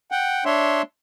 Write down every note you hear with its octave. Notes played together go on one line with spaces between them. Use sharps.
F#5 G5
D4 C#5 E5 C6